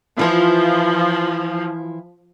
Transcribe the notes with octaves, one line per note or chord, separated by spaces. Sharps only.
E3 F3 E4 F4